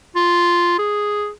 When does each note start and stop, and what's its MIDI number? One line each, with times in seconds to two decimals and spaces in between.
0.16 0.77 65
0.79 1.30 68